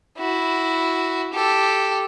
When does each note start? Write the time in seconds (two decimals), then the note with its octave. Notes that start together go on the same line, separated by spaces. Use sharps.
0.18 E4 F#4
1.33 G4 A4